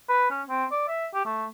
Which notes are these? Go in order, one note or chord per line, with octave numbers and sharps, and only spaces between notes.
B4
C#4
C4
D5
E5
G4
A3